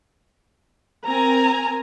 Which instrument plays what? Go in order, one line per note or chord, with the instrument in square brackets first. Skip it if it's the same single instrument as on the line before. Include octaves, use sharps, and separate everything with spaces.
[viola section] C4 A#4 G#5 A#5